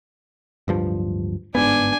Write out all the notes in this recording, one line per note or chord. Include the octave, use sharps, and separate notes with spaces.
D1 G2 F3
G1 G#2 B3 D4 G#5